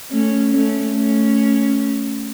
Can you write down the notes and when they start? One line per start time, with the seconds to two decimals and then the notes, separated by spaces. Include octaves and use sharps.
0.11 A3 C#4
0.53 A3 C#4
0.96 A3 C#4